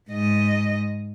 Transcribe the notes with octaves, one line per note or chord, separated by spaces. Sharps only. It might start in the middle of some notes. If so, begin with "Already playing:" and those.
G#2 D#5